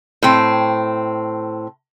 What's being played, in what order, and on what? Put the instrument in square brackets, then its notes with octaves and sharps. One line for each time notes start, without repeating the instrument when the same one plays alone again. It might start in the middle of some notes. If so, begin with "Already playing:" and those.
[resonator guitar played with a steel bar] A2 C4